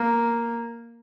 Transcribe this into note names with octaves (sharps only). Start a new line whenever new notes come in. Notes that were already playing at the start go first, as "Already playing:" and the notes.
Already playing: A#3